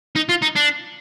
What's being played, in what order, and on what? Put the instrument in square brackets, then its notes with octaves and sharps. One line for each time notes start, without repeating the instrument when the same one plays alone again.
[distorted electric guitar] D#4
F4
D#4
D4